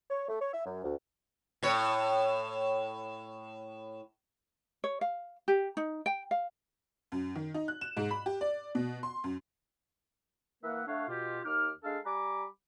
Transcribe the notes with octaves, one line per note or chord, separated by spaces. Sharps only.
C#5
A3
C#5
E5
F#2
D2
A2 C#5
C#5
F5
G4
D#4
G5
F5
F#2
D#3
D#4
F#6
E7
G#2
B5
G4
D5
B2
C6
F#2
E3 A#3 A#4 E5 F#5
A3 D4 A4 C#5 F5 F#5
B2 F4 G4
D#2 D#4 D6 F6
G#3 D4 G#4 A4 F5
G3 G#5 A#5 B5 D6